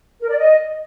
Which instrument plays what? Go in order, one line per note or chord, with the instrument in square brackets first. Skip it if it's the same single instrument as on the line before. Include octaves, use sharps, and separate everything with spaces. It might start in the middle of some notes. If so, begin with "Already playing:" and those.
[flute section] A#4
D5
D#5